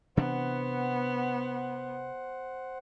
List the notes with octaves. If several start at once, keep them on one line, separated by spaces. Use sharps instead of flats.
C3 E3 B3 D4 C5 F#5